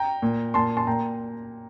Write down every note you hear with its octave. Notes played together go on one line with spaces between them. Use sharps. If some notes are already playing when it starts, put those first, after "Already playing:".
Already playing: G5 A#5
A#2
A#2 A5 C6
A5 C6
A#2 G5 A#5